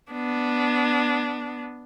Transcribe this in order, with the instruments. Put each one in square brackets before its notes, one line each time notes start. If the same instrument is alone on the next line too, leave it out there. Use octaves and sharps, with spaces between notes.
[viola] B3 D4